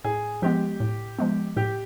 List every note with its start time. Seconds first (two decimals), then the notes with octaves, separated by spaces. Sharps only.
0.04 A2 G#4
0.42 F3 G#3 B3 G4
0.80 A2
1.19 F3 G#3 B3
1.56 A2 G4